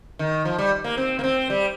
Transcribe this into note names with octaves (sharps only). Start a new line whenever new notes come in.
D#3
F3
G3
A#3
C4
A#3
C4
G3